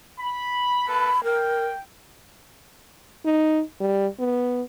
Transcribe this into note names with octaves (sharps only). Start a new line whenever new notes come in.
B5
A#3 A4 B4 B5
A#4 G5
D#4
G3
B3